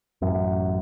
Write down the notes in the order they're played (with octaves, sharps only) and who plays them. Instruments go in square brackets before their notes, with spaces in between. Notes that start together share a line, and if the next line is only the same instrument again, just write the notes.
[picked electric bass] A1 F#2